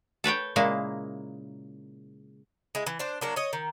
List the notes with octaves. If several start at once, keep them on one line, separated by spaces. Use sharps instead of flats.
A4 B4 C#5 G5
A#2 C#3 G#3 A#3 E4
G#3 E4
E3
D4 C5
F#3 A#3 D4
C#5 D#5
D#3